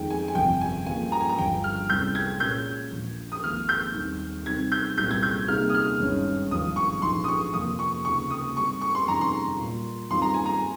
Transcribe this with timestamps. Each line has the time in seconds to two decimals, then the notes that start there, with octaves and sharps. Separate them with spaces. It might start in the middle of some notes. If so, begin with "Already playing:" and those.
Already playing: F2 D#3 G#3 C4 D#4 G5
0.10 G#5
0.28 G#5
0.35 G1 F2 C3 F3 G5
0.61 G#5
0.86 G2 F3 A#3 G#5
1.12 A#5
1.20 G#5
1.29 A#5
1.38 G1 G2 F3 G5
1.64 F6
1.89 C2 C3 G3 C#4 G6
2.15 G#6
2.40 A#2 G#3 C#4 G4 A#4 G6
2.91 A#1 A#2 F3
3.32 D#6
3.43 G#1 G#2 F3 A#3 F6
3.69 G6
3.94 D#2 D#3 G3 C4
4.45 C3 D#3 G3 C4 G#6
4.72 G6
4.97 C2 A#2 G3 C4 G6
5.11 G#6
5.23 G6
5.48 C3 G3 A#3 D#4 G#4 F6
5.69 D#6
5.74 F6
5.99 G#1 G2 D#3 G#3 C#4
6.51 G#1 G2 F3 D#6
6.76 C#6
7.02 A#1 G#2 F3 C6
7.24 D#6
7.28 C#6
7.54 F2 C3 F3 A#3 D#6
7.79 C#6
8.05 C#2 C3 D#3 A#3 F4 C#6
8.30 D#6
8.56 G#2 G3 C4 G4 C#6
8.82 C#6
8.95 C6
9.08 F2 C3 D#3 G3 A#5
9.21 C6
9.59 A#2 G3 A#3 F4
10.10 G2 D#3 G3 C4 F4 C6
10.22 A#5
10.34 G#5
10.46 A#5